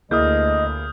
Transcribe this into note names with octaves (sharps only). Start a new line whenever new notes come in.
D2 A#3 E4 G#4 D#5 D#6 F6 G6